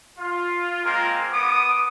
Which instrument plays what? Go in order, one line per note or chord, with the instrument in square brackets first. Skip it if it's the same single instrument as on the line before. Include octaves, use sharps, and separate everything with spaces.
[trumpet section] F4
G#3 A#3 C4 F4 A#4
B3 D6 D#6